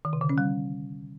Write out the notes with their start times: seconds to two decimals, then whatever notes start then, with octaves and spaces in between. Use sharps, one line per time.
0.05 D#3
0.13 C3
0.21 D3
0.29 C#4
0.38 G3